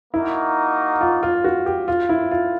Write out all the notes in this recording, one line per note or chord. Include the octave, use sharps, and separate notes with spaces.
A#3 D#4 E4 F#4 A#4
F4
F4
F#4
G4
F4
E4
F4